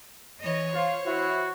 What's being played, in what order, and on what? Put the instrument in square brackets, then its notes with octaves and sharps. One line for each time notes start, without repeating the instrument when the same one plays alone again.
[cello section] E3 D#5 [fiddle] C#5
[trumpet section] F4 [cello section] C5
[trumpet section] E4 [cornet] F#4